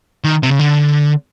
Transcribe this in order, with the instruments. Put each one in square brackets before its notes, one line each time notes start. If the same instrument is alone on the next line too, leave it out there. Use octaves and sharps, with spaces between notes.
[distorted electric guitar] D#3
C3
C#3
D3